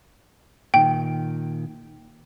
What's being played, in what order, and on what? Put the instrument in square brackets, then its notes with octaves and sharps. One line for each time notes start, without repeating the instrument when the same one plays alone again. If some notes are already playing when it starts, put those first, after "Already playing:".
[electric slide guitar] A#2 D#3 [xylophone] G5